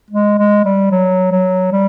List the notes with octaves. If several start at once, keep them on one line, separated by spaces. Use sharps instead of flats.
G#3
G#3
G3
F#3
F#3
G3